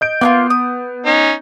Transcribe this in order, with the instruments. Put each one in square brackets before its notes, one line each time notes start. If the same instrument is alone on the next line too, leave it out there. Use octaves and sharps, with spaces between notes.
[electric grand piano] D#5 G6 D7
[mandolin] A#3 D#4 F4 [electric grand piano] B3
[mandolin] D#6
[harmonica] C#4 D#4